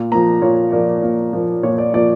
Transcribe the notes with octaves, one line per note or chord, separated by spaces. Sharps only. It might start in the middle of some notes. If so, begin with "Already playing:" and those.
Already playing: A#2
F3 A#3 A#5
A#2 C#5
F3 A#3 D5
A#2
F3 A#3
A#2 C#5
D5
F3 A#3 D5